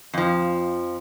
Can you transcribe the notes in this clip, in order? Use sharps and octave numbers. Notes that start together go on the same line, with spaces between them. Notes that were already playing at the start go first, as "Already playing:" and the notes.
F2 F3